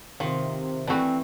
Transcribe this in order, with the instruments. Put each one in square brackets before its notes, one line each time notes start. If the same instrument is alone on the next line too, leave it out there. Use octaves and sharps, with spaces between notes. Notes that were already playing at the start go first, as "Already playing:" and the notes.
[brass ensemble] C3 [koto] D#3 [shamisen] F3
[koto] E3 A3 [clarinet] C4 [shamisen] D4 F#4